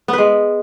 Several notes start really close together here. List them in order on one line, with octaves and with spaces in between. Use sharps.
B3 B4 G#3